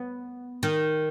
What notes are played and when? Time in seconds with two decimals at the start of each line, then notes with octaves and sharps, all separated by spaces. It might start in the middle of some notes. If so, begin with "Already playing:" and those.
Already playing: B3
0.63 D#3